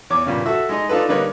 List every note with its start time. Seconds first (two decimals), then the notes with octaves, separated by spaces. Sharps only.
0.10 E2 C#5 D6
0.26 G2 A#2 C#3
0.45 F#4 A4 E5
0.69 G#3 D#4 D#5
0.89 D4 D#4 F4 A4 B4
1.08 D3 G3 A#3 D#4 B4 C#5